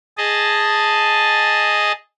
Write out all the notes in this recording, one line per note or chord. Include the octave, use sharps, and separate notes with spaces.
G#4 D#5 A5